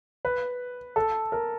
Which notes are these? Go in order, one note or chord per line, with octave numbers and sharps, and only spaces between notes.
B4
A4
A#4